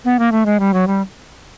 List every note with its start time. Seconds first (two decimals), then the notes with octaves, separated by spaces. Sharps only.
0.05 B3
0.19 A#3
0.32 A3
0.46 G#3
0.60 G3
0.74 F#3
0.87 G3